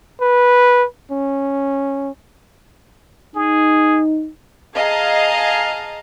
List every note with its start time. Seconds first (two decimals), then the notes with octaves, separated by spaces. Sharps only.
0.21 B4
1.11 C#4
3.36 D#4 G#4
4.75 G#4 D#5 F5 A5 A#5